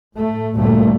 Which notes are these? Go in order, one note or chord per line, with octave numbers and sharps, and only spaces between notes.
A2 A3
G1 D2 A#2 G3 A3 A#3